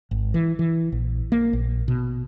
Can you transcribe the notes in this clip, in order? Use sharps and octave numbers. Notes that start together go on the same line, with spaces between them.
G#1
E3
E3
A#1
A#3
A#1
B2